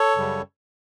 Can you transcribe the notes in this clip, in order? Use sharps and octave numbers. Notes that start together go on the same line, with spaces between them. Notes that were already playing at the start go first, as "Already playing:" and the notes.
Already playing: A4 C#5
F#2 C#3 G3